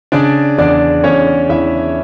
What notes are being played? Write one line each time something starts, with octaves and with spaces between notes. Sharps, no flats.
C#3 D4 D5
E2 D4 D5
E2 C#4 C#5
E2 E4 E5